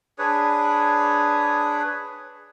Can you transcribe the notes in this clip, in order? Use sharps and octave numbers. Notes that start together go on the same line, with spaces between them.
D4 G#4 B4 C#5